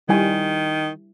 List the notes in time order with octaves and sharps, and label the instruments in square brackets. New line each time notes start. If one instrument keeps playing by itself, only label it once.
[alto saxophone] D#3 [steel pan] G3 E4 G#5